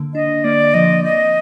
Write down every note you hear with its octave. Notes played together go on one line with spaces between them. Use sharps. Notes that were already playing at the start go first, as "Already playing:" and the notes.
Already playing: D3 A#3
D4 D#5
A#3 D5
F3 D#5
C4 D#5